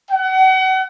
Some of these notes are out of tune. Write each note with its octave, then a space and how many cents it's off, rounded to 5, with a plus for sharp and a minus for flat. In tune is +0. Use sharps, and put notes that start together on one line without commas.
F#5 +35